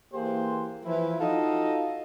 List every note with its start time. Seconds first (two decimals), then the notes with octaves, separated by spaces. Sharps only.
0.14 E3 A#3 G4 G#4 C5
0.85 E3 F3 E4
1.19 D#4 F4 F#4 A4 D#5 F5